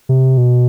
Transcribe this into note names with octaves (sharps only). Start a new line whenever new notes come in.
C3
B2